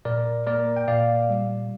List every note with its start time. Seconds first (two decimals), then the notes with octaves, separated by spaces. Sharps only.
0.05 A#2 A#4 D5
0.47 A#3 A#4 D5
0.76 G5
0.88 A#2 D5 F5
1.29 G3